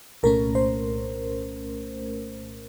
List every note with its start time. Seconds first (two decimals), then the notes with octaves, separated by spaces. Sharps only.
0.23 C2 A#2 A3 C#4 A#4
0.55 C5